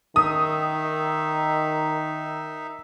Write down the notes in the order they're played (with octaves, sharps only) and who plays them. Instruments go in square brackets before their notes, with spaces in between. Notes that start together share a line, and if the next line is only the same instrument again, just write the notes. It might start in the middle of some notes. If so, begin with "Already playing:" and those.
[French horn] D#3 [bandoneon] D#4 E5 [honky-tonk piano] D#6